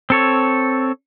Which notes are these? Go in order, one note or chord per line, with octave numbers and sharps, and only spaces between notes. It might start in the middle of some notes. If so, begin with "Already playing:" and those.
C4 A4 C#5